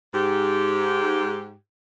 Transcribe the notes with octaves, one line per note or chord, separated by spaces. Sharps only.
G#2 G4